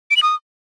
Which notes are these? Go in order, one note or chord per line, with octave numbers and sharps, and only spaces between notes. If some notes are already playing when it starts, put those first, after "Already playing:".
D7
F#7
D#6